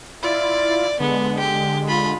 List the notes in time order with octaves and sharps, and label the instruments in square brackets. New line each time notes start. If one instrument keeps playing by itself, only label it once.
[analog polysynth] E4 F4 A6 [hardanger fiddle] D5
[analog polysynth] D3 G#3 [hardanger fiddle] B3
[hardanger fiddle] G4
F4 B5